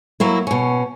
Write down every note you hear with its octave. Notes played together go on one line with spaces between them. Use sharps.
F#3 A#3 E4
B2 C#4